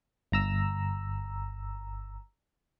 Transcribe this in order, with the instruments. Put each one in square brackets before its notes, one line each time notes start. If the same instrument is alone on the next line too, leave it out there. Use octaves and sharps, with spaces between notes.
[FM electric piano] G1 A#5 E6